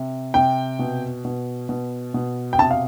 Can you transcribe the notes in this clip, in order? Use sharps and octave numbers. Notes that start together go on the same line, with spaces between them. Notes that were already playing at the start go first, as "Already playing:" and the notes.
Already playing: C3
C3 G5
B2
B2
B2
B2
G5
C3 A5
F5